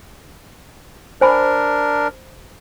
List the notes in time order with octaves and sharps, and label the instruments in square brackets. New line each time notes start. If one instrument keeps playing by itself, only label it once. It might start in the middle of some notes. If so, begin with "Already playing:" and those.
[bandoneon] D4 A#4 [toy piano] C5 G#5 B5